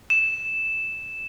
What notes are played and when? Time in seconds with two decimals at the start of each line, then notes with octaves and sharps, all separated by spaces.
0.10 E7